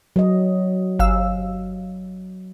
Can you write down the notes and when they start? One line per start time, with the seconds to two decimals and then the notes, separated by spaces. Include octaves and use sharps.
0.16 F#3 D#5
0.99 G1 F5 E6